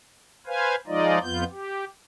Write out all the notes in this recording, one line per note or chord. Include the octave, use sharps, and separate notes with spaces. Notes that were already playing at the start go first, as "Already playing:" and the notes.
B4 C5 F5 G#5
F3 G#3 D#4 F4 D5 D#5
F2 B3 F4 G6
G4